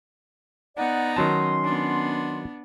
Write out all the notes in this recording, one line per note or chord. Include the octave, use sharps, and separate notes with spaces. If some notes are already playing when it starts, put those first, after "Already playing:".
B3 D#4 D5 F#5 A#5
D#3 F#3 C#4 A5 C6
B3 D4